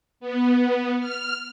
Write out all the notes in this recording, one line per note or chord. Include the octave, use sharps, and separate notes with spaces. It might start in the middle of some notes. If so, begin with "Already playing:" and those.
B3
F6